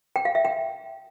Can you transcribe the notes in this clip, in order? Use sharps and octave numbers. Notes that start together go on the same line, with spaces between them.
G5
F5
E5
G5